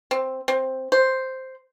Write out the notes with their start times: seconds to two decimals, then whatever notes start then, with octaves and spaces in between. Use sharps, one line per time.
0.11 C4
0.48 C4
0.92 C5